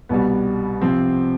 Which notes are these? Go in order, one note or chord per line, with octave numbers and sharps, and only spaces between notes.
C2 B2 G3 B3
C3 F3 C4